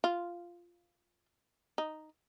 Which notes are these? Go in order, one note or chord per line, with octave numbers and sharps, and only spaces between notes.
F4
D#4